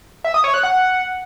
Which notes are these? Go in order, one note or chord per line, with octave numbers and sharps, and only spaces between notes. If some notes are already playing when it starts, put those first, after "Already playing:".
E5
D#6
C#5
F#6
F#5